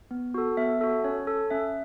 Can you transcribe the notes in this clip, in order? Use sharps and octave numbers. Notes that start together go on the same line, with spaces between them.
B3
F#4 A4
B3 E5
F#4 A4
C#4 C#5
A4
C#4 E5